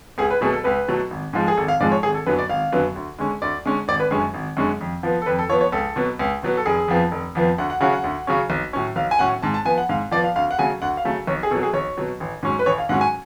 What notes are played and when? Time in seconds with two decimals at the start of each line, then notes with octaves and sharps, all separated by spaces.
0.18 C#2 G#4
0.30 B4
0.41 B2 F#3 A3 G#4
0.53 A4
0.64 C#2 B4
0.88 B2 F#3 A3
1.11 G#1
1.33 G#2 F3 G#3
1.48 G#4
1.57 G#1 A4
1.68 F5
1.80 G#2 F3 G#3 D5
1.92 C#5
2.03 G#1 G#4
2.14 A4
2.26 F#2 D3 F#3 B3 B4
2.38 D5
2.49 G#1 F5
2.72 F#2 D3 F#3 B3
2.96 D2
3.19 D3 G#3 C#4
3.42 D2 D5
3.66 D3 G#3 C#4
3.88 G#1 D5
4.00 B4
4.11 F#2 D3 G#3 C#4 G#4
4.34 G#1
4.57 F#2 D3 G#3 C#4
4.81 F2
5.03 F3 B3
5.22 A4
5.26 F2 B4
5.39 A4
5.49 F3 B3 C#5
5.61 C#5
5.72 C#2 A4
5.96 B2 F#3 B3
6.19 C#2
6.43 B2 F#3 B3
6.57 A4
6.66 F1 G#4
6.88 F2 F3 B3
7.11 F1
7.35 F2 F3 B3
7.58 D2 F#5
7.70 F#5
7.80 C#3 F#3 C#4 F#5
7.93 F#5
8.04 D2
8.27 C#3 F#3 C#4
8.50 B1
8.73 A2 F#3 C#4
8.96 B1 F5
9.11 G#5
9.19 A2 F#3 C#4 F#5
9.42 G#2 A5
9.54 A5
9.65 F3 B3 G#5
9.78 F#5
9.89 G#2 F5
10.12 F3 B3 D5
10.24 F5
10.36 D2 F5
10.51 F#5
10.58 C#3 F#3 A3 G#5
10.82 D2 F#5
10.97 F5
11.05 C#3 F#3 A3
11.27 B1 C#5
11.43 G#4
11.51 B2 F#3 A4
11.63 G#4
11.73 B1 C#5
11.98 B2 F#3
12.20 A1
12.43 G#2 F#3 C#4
12.59 B4
12.66 A1 C#5
12.78 F5
12.89 G#2 F#3 C#4 F#5
13.01 G#5